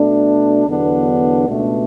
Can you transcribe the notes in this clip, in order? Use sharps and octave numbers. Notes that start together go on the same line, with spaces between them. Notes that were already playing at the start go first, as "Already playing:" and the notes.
Already playing: B2 A3 D4
E2 D3 F#3 B3 D4
C#2 B2 A3 D4